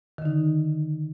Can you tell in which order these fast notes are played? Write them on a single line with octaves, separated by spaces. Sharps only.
D#3 D3 D#4